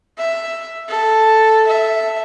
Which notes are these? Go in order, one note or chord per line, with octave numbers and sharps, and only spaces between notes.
E5
A4
E5